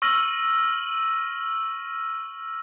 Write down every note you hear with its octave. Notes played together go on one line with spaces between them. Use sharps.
C#6 E6 F6 A#6 D#7 F#7